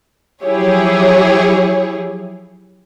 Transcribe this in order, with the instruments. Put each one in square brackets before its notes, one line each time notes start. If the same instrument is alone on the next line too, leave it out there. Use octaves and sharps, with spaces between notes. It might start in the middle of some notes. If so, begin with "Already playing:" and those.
[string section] F3 F#3 E4 G4 G#4 C#5